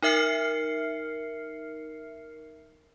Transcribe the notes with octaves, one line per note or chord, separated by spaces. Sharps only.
D#4 A#4 E5 F6 C7 C#7